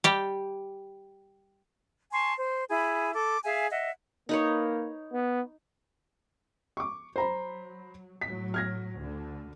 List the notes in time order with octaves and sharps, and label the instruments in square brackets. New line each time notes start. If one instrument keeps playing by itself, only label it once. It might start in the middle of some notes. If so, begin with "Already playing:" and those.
[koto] G3 G4
[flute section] G#5 A5 C6 C#6
C5
E4 G#4 B5
A4 D6
G#4 E5 F5 G#5
D#5 E5 F#5
[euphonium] A#3 [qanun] D#4 B4 C#5
[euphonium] B3
[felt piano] C#6 D6
[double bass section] F#3 [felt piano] C5 A#5 B5
[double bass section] A2 F#3 [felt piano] B6
[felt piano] F6 G#6 A#6
[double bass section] D2 D3